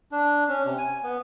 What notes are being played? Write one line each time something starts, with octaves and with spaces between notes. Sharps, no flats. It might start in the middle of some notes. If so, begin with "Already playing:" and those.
D4
C#4
C3
G#5
B3